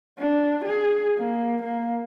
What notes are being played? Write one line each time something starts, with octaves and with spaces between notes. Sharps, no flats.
D4
G#4
A#3
A#3